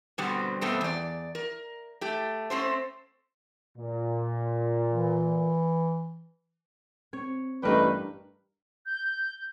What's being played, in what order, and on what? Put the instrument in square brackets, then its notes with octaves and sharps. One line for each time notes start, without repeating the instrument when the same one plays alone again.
[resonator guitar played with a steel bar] B2 D3 G3 B3 C4
G2 B2 G3 A3 B3 C4
E2 D5
A#4
A3 G4
A3 C4 C#4 C5
[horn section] A#2
[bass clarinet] E3
[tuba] C4 [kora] C#5
[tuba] A1 [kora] G2 A#4 G5 [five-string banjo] G3 A3 D#5 [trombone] B4
[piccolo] G6